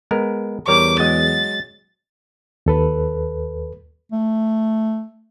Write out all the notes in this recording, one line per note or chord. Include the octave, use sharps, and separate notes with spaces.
G#3 B3 A#4
E2 G3 A#4 C#5 D6
F#3 G#3 D#5 A6
D#2 A4 B4
A3